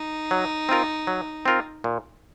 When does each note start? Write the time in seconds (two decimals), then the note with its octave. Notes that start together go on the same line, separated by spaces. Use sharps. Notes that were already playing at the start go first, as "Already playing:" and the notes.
Already playing: D#4
0.31 F#3
0.69 C4 F4 A#4
1.07 F#3
1.46 C4 F4 A#4
1.84 A#2